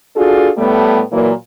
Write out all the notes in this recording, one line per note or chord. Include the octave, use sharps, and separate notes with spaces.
D4 F4 F#4 G#4 A4
A2 G3 A3 B3
A#2 E3 F#3 A#3